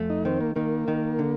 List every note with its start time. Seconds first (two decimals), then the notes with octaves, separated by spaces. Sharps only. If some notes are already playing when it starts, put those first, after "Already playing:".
Already playing: F2 A3
0.10 D#4
0.25 D#3 C4
0.41 A#3
0.56 D#3 A#3
0.88 D#3
1.19 D3